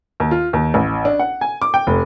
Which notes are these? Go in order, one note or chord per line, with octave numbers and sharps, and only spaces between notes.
D#2
F4
D#2
A1
D4
F#5
G#5
D6
G5
F1